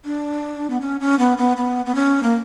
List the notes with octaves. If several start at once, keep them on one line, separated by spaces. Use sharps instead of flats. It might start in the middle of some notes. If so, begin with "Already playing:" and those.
D4
B3
C#4
C#4
B3
B3
B3
B3
C#4
A#3